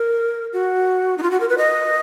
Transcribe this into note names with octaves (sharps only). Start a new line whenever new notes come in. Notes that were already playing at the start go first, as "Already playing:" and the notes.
Already playing: A#4
F#4
D#4
F4
F#4
A#4
B4
D#5